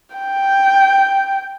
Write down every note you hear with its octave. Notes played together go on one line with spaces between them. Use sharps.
G5